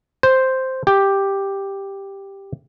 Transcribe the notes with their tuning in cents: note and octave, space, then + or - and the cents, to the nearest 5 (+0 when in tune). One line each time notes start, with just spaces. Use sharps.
C5 +0
G4 +5